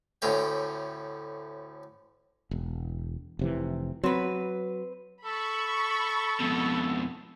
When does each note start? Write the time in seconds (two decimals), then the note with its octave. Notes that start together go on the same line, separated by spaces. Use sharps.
0.22 D2 A2 C#4 G5
2.51 E1
3.39 F1 C3 E3
4.04 F#3 C4 B4
5.25 A4 B5 C#6
6.40 F2 B2